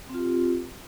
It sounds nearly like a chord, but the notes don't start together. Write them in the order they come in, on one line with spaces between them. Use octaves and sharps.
C4 F4 G4